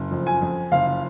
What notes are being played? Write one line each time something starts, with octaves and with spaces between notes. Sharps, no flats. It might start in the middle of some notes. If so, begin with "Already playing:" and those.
Already playing: F#1
F2
G#5
F2
F#1 F5